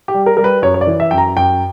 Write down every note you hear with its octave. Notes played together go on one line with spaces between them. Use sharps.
G4
G3
A#4
G3 A#4
B4
F#2 C#5
C#5
D5
E3
E5
F#2 G5
A#5
F#2 G5